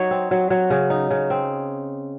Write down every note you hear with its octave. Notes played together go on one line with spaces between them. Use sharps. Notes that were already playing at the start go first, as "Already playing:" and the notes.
Already playing: F#3 D#4 C#5
C4
F#3
F#3
C#3
D#4
C#3
C4